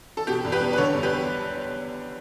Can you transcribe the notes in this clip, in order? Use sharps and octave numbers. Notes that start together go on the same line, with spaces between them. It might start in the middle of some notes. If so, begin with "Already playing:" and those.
A4
B2 G4
E2
G4 B4
G3
B4
D3 A4 C#5
E2
G4 B4